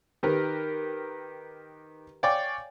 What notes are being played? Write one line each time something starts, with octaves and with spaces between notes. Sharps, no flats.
D#3 G4 A#4 B4
C#5 D5 F5 G5 G#5 D6